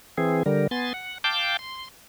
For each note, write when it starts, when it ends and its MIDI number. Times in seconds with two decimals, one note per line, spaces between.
0.18 0.43 52
0.18 0.43 60
0.18 0.43 68
0.46 0.67 50
0.46 0.67 55
0.46 0.67 70
0.71 0.93 59
0.71 0.93 80
0.71 0.93 84
0.71 0.93 93
0.94 1.18 78
1.24 1.57 77
1.24 1.57 79
1.24 1.57 81
1.24 1.57 86
1.24 1.57 91
1.59 1.88 84